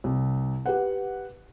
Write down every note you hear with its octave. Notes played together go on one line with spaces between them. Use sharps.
C2
G4 B4 F#5